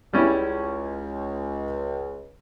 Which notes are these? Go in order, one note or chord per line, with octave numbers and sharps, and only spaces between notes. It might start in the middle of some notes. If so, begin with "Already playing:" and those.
C#2 G3 C#4 E4